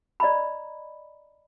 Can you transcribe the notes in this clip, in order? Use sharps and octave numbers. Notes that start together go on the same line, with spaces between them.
D5 D#5 A#5 B5